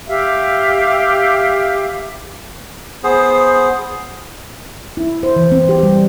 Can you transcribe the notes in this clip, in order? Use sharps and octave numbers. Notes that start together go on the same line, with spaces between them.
G4 E5 F5
B3 G#4 C5
E4
C5
E3
C4
G4
G3